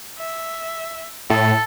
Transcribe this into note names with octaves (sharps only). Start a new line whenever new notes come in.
E5
A2 A4